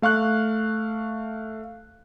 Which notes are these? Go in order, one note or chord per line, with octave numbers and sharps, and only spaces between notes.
A3 F5 C#6 F#6